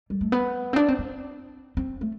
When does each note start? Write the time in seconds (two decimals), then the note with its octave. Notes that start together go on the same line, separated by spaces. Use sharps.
0.10 G3
0.21 A3
0.32 B3
0.73 C4
0.76 D4
0.88 C4
0.99 C4
1.77 C4
2.01 A3